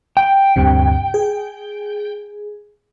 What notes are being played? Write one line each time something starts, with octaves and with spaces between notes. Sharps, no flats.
G5
D2 G2 C3
G#4